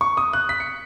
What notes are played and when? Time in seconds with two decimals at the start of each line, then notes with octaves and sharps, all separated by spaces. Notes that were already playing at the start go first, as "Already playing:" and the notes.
0.01 C#6
0.17 D#6
0.33 F#6
0.49 B6
0.60 C#7